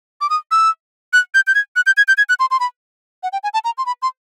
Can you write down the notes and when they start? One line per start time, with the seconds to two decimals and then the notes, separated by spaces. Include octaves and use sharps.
0.21 D6
0.30 D#6
0.51 E6
1.13 F#6
1.34 G6
1.47 G6
1.55 G#6
1.76 F#6
1.86 G6
1.97 G#6
2.08 G6
2.18 G#6
2.29 F#6
2.40 C6
2.51 C6
2.60 B5
3.23 F#5
3.33 G5
3.43 G#5
3.54 A5
3.64 A#5
3.78 C6
3.86 B5
4.02 C6